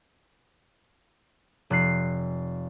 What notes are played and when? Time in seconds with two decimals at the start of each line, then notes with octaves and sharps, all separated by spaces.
1.70 F1 F#6 C7